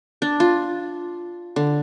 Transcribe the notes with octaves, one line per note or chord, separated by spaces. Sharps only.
D4
F4
D3